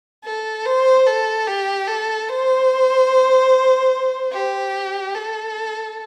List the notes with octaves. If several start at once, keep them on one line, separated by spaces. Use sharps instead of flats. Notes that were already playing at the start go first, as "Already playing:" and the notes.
A4
C5
A4
G4
A4
C5
G4
A4